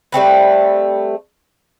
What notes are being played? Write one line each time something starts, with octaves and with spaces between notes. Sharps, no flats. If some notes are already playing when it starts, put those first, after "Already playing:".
G3 A3 C4 B4